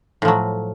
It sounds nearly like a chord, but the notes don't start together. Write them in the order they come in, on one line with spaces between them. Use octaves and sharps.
A2 F3 F#3